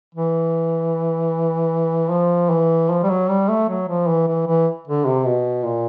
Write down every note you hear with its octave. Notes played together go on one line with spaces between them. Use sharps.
E3
F3
E3
F3
G3
F#3
G3
A3
F#3
F3
E3
E3
E3
D3
C3
B2
A#2